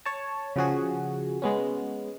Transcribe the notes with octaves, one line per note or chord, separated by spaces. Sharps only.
C#5 A5
C#3 F3 F#4 G#4
G#3 B3 C#4